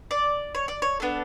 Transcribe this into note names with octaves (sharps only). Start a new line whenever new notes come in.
D5
C#5
D5
C#5
B3 D4 A4